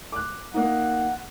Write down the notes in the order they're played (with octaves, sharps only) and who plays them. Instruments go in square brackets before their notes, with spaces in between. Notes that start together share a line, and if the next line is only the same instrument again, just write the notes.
[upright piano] D6 F#6
[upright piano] A#3 D#4 [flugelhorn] F#5